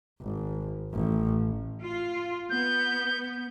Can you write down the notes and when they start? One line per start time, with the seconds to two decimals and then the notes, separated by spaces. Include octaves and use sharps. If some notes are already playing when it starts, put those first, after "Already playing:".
0.21 G#1
0.93 A1
1.81 F4
2.50 B3 G6